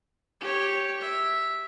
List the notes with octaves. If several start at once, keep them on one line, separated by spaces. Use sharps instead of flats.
G4 C#5
E5